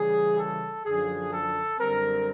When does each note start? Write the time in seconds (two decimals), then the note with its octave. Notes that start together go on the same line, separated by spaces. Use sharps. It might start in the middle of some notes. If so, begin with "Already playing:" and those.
Already playing: C#3 E3 G3 G#4
0.37 A4
0.85 F#2 D3 F3 G#4
1.31 A4
1.79 F#2 D3 G3 C4 A#4